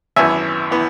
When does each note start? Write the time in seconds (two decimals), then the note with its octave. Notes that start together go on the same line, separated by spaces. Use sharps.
0.16 G#1 F#2 E3 B3 E5 G#5
0.71 E3 B3